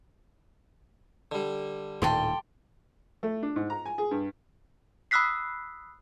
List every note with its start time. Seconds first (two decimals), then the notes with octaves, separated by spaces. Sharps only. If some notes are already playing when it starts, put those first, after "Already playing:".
1.32 D3 G3
2.02 D#1 A2 D#3 G4 A4 C6
3.23 A3
3.43 D4
3.56 G#2
3.70 A#5
3.86 G#5
3.98 G#4
4.11 G2
5.11 B5 D#6 E6 F#6 B6 C7